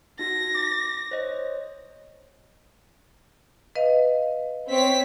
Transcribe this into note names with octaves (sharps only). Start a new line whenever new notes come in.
D#4 F#4 A#6
D6
C5 C#5 D#5
B4 D#5 F5
C4 C#5 B6